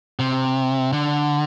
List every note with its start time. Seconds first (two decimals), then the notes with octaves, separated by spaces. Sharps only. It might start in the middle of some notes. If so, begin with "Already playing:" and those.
0.19 C3
0.93 D3